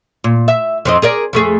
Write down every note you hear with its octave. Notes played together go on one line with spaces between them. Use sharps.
A#2
E5
F2 C4 D#5
G#4 A#4 D5
F2 A3 G#4